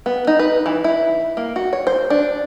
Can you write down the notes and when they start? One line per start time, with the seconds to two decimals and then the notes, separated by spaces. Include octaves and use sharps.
0.06 B3
0.27 D#4
0.39 B4
0.66 E3
0.84 E4
1.37 A#3
1.56 F#4
1.73 C#5
1.87 C5
2.10 D4